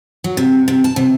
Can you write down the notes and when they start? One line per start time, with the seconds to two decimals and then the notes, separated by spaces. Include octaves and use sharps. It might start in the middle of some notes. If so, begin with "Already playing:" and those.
0.24 F#3
0.37 C3
0.68 C3
0.84 A5
0.96 C3